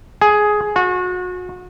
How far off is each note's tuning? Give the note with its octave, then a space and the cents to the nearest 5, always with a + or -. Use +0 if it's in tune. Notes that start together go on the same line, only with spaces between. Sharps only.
G#4 +10
F#4 -35